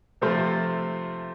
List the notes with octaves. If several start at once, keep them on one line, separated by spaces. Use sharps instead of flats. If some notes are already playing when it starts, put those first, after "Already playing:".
C3 F3 A3 C4 F4